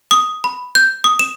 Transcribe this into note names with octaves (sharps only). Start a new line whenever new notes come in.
D#6
B5
G6
D#6
E7